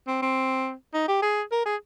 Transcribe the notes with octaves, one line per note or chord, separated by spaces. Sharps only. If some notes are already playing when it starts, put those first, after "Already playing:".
C4
C4
D#4
G4
G#4
A#4
G#4